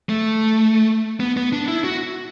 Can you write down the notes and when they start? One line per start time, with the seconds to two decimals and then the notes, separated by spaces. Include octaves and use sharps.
0.09 A3
1.20 B3
1.37 B3
1.52 D4
1.68 E4
1.84 F#4